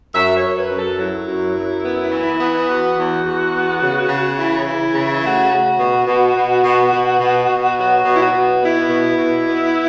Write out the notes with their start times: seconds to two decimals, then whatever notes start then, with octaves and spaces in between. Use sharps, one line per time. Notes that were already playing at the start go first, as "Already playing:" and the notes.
0.14 F#2 E5
0.35 C#5
0.42 F#2
0.57 B4
0.71 F#2
0.78 A4
0.98 F#3 E4
1.27 F#2
1.55 F#2
1.83 B3
2.12 E3
2.40 B3
2.68 E2 F#4
2.97 E2
3.24 E2
3.53 B3
3.81 C#3
4.09 C#3
4.38 E3 E4
4.66 E3
4.94 C#3
5.22 A3 F#4
5.50 A3
5.78 B2
6.07 B2
6.35 B2
6.64 B2
6.92 B2
7.20 B2
7.49 B2
7.77 F#3 F#4
8.05 B2
8.13 E4
8.19 F#4
8.33 B2
8.61 B3 E4
8.89 B2
9.18 B2
9.46 B3